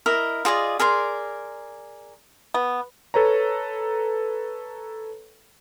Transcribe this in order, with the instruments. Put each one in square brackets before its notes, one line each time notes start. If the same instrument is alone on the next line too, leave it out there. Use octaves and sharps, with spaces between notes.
[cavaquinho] E4 A#4 D#5
F4 G#4 D5 D#5
G#4 A#4 D5 C6
[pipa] B3
[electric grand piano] A4 B4 C#5 A#5